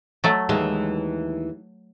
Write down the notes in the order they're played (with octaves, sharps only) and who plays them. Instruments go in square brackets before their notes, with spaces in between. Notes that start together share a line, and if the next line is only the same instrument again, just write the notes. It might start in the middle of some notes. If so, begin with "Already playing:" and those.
[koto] F#3 A3
[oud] D#2 E3 G#3